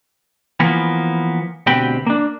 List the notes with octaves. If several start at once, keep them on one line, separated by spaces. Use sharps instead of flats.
E3 F3 A#3 B3
D2 B2 C4 G4 B4 G5
A#3 D4